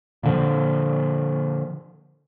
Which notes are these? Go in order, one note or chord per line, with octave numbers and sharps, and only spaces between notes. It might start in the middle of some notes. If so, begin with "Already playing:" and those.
A#2 D3 F3